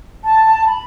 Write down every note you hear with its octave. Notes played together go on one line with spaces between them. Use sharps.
A5
B5